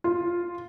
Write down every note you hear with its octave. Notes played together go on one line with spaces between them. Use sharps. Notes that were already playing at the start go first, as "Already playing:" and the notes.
F4